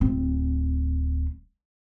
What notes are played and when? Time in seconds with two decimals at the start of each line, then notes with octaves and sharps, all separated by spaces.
0.01 D1 C4